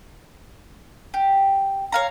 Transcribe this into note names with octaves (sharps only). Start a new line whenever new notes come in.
G4
C#5 F5 A#5